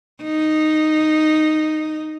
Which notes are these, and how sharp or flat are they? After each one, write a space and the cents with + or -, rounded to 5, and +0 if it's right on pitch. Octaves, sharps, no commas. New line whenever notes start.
D#4 -5